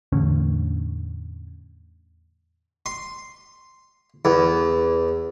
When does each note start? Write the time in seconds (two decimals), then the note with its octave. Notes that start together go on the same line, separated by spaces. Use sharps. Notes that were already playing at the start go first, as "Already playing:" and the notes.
0.12 E2 A2 D3 C#4
2.86 C6
4.25 E2